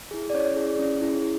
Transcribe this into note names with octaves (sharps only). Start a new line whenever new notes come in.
E4 G#4
D5
C#4 C#5
E4 G#4
C#4
E4 G#4